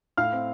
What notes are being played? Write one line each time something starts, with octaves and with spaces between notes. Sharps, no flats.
A2 F5 F6
C4